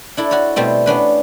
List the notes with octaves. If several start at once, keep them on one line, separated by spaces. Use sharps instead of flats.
D4 E4 A4
F#4 C#5
B2 G3 A3 C4
B3 C#4 D4 B4